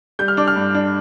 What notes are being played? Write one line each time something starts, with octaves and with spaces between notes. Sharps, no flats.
G3 G6
F6
D4 D6
F6
G2
D4